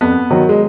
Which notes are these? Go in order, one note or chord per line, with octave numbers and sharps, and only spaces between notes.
F2 B3
D#3 F#3
G#3